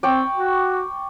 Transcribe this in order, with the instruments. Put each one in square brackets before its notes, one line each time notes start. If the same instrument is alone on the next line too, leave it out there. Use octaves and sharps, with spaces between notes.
[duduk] C4 [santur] D5 G5 C#6
[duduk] F#4